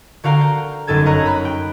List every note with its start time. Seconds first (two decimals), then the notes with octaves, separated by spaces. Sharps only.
0.24 D3 F#4 A#4 F5 G5 A#5
0.41 G6
0.87 G1 F#2 D#4 A4 G#6
1.06 A#4 C#5 D#5 A#5 F#6
1.26 B5 F#6
1.45 G5